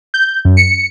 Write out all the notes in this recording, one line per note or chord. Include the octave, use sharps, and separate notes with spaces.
G6
F#2
C#7